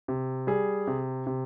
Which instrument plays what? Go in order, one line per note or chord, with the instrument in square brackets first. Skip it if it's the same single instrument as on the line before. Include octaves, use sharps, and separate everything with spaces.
[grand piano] C3
G3 G#4
C3
C3